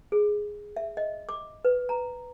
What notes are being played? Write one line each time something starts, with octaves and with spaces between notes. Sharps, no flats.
G#4
E5
D#5
D6
B4
A#5